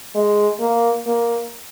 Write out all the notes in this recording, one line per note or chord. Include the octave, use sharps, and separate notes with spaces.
G#3
A#3
A#3